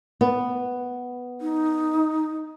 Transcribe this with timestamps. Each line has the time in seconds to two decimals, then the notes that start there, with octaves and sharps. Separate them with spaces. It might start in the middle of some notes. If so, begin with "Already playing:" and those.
0.21 B3
1.41 D#4